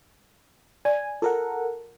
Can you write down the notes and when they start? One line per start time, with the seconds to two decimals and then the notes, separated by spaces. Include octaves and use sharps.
0.85 D5 G#5
1.22 F4 A4 A#4 F#5